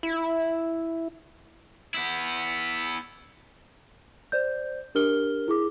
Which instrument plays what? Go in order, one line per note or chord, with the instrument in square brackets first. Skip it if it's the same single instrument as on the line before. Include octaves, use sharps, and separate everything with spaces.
[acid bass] E4
[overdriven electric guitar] B3 E4
[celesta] C5 D5 G6
D4 G4 A#4 F6 G7
E4 G#4 D6